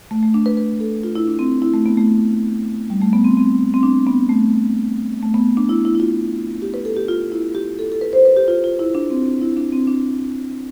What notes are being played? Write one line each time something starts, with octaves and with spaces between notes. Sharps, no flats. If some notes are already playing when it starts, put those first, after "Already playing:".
A3
A3
D4
B4
B4
A4
F4
E4
D4
C4
E4
A3
B3
A3
G3
A3
B3
C4
C4
C4
D4
B3
A3
A3
B3
D4
E4
E4
E4
F4
G4
B4
A4
G4
F4
E4
G4
A4
A4
B4
C5
B4
G4
F4
F4
E4
D4
C4
D4
E4
D4
C4
D4